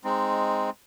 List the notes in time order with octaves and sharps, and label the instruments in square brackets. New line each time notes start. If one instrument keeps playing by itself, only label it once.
[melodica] G#3 C4 D#4